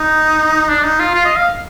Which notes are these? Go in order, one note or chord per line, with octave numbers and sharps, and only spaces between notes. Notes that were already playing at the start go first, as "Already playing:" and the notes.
Already playing: D#4
D4
D#4
F4
F4
D#5
F5